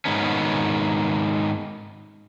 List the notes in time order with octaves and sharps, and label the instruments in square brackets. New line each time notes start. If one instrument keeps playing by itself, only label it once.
[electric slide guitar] G#2 D#3 B3 C#4